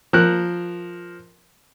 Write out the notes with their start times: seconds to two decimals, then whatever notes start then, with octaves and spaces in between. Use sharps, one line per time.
0.13 F3 A#4 F#6